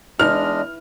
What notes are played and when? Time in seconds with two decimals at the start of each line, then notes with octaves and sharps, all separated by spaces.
0.19 E2 G#3 D4 D#5 F6